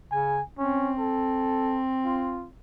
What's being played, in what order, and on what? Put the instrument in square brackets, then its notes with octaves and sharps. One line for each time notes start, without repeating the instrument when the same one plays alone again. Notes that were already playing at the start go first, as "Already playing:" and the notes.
[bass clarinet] C#3 [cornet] G#5
[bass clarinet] C4 [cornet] C#4
[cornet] A4
F4